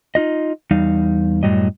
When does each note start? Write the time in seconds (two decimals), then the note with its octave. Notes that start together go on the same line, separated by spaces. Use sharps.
0.15 D#4 F4 D#5
0.71 E2 G3 D#4 F5
1.43 F#2 A2 F#3 G3 D#5